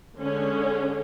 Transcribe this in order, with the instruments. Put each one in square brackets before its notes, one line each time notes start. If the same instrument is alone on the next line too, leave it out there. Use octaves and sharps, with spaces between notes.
[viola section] D3 G#3 C#4